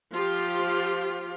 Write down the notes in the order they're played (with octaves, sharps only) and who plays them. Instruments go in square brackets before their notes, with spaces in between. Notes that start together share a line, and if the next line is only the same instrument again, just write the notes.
[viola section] F3 F4 G4